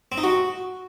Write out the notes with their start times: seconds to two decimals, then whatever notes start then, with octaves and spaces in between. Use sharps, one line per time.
0.12 C4
0.18 D#4
0.23 F#4